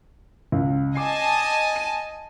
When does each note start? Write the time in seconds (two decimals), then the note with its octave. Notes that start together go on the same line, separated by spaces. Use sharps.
0.52 C#2
0.95 D#5 G#5 A5 D6 C7
1.76 D#7